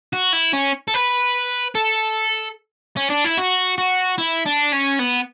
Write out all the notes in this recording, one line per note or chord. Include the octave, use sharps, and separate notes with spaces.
F#4
E4
C#4
A4
B4
A4
C#4
D4
E4
F#4
F#4
E4
D4
C#4
B3